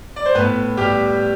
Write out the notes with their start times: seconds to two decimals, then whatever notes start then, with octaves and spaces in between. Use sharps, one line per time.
0.16 D5
0.25 C5
0.35 A2 B3 B4
0.77 A2 G3 G4